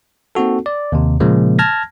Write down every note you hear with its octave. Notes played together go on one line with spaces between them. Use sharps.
A#3 C4 D#4 F#4 A4
D5
D#2 C3
A#2 C#3 F3 G#3 A#3
A5 F6 G#6 A#6